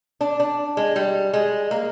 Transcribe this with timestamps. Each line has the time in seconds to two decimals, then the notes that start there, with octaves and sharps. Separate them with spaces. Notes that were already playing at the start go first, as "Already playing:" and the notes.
0.21 D4
0.40 D4
0.77 G#3
0.96 G3
1.33 G#3
1.71 A#3